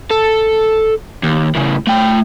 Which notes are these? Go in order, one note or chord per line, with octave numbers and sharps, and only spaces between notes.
A4
D#2
A2 C#3
A3 G5